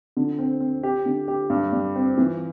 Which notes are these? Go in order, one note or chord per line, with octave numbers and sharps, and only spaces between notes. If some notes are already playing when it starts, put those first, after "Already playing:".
D3
C4
C4
G4
D3
G4
G2
G3
C4
E3